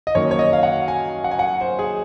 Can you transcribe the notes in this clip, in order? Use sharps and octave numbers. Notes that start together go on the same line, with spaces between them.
D#5
F#2 D#3 A#3 C#5
C#5
D#5
F5
F#5
G#5
F#5
G#5
F#5
C5
G#4